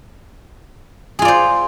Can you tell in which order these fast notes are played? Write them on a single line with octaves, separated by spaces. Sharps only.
G#4 F4 D5 C5